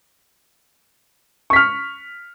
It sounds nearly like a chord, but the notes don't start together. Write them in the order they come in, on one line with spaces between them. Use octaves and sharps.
C#6 B6 F6